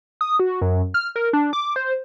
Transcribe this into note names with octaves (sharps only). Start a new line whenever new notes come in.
D#6
F#4
F#2
F6
A#4
D4
D6
C5